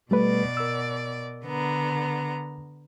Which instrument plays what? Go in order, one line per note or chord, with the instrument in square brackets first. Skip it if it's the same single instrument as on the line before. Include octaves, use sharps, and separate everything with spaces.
[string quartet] B2 D5 [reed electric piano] G3 A3 B4
[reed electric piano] A#4 E6
[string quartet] D3 B3 A#5